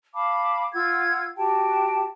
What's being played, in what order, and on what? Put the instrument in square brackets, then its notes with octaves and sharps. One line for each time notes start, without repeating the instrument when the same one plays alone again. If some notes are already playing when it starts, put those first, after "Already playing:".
[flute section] F5 A5 B5 D6
F4 F#5 E6 G#6
F#4 G4 G5 A5